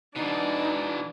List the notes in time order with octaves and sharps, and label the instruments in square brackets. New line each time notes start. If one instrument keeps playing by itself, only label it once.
[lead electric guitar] B2 E3 [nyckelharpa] D4 [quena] D#4